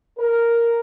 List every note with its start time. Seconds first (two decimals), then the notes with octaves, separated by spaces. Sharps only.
0.18 A#4